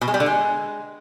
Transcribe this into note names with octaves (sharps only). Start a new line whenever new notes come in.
B2
G#3
G3
D3
G#3